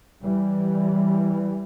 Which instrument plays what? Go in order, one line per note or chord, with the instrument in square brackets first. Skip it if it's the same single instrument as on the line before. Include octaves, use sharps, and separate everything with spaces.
[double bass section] E3 G3